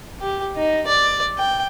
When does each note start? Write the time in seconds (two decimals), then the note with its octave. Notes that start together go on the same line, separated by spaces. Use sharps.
0.21 G4
0.56 D#4
0.87 D5
1.38 G5